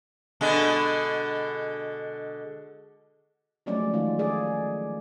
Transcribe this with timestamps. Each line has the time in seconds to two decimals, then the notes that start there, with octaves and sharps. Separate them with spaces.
0.41 B2 D3 G#3
3.66 F3 F#3 G#3 A3 C#4 D5
3.93 D#3 E3 G#3 C#4 F4
4.19 G#4 D5